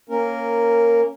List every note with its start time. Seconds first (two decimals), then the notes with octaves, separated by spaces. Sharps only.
0.09 A#3 C#4 A#4